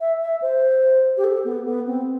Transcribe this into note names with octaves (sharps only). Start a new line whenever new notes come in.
E5
E5
C5
G4
A4
B3
B3
C4